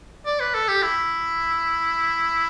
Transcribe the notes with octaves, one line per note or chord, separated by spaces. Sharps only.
D5
B4
A4
G4
E4